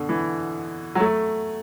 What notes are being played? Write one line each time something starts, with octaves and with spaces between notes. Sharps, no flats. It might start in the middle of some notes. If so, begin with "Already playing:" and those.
Already playing: B2 D3
E3
F#3
A3